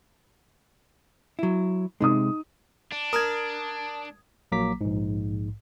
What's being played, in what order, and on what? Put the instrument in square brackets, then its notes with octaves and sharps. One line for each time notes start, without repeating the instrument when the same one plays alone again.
[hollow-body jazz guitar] F#3 E4
[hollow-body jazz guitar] C3 G#3 [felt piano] D#4 D#6
[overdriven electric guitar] D4
[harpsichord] A#4 [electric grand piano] D#6 G#6
[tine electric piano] A#1 F#3 A#3 A#5 D6 B6
A#1 G#2